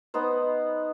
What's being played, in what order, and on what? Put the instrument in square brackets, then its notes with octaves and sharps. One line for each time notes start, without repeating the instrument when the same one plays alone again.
[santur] B3 D#4 C5